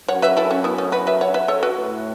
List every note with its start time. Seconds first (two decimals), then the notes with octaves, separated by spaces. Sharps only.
0.08 F#2 C#5 F#5
0.22 B4 E5
0.37 E4 A4
0.50 C#4 F#4
0.64 B3 E4
0.78 A3 C#4
0.92 F#4 B4
1.07 B4 E5
1.21 C#5 F#5
1.34 B4 E5
1.48 A4 C#5
1.63 F#4 B4
1.77 A2